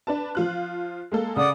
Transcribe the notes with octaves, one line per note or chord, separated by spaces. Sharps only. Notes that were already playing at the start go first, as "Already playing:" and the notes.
D4 B4 A5
F3 F4 F#6
G#3 A#3 A4
C#3 D5 F#5 D#6